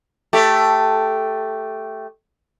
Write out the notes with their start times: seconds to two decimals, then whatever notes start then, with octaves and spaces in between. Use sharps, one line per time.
0.33 A3 G4